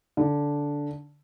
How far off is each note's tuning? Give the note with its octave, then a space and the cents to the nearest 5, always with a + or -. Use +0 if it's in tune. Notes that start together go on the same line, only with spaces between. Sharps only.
D3 -10